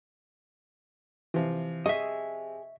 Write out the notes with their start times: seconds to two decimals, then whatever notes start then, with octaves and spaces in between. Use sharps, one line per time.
1.34 C3 E3 F3
1.86 G#4 D#5 E5 C#6